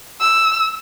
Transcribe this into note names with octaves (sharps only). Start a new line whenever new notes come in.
E6